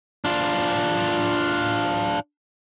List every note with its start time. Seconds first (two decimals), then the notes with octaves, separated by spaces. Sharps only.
0.25 D4 F4